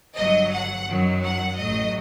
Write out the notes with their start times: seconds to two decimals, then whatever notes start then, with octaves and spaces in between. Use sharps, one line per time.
0.16 G1 G2 F#3 D#5
0.52 F#5
0.87 F#2 D#3 F#3
1.23 F#5
1.57 A1 A2 F#3 D#5